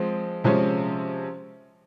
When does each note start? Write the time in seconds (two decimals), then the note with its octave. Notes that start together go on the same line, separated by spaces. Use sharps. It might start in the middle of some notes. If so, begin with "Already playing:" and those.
Already playing: F3 G#3 C4
0.44 C3 F3 G#3 C#4